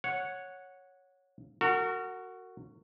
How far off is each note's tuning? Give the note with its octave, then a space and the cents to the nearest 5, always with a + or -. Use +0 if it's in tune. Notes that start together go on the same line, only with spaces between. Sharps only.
C#5 +0 F#5 -10
F#4 +0 A#4 -35